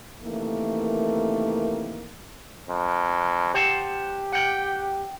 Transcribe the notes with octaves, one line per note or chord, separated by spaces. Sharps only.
C3 D#3 E3 A3 A#3
F2
G4 C5 F#5 A5
F#5 G5